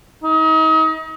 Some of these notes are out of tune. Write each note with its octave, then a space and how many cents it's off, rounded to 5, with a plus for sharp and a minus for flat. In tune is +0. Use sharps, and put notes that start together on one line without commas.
D#4 +35